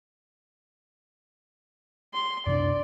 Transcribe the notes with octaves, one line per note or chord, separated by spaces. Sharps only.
C6
F#2 C3 D4 D5